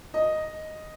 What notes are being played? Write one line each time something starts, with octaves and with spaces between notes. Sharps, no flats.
D#5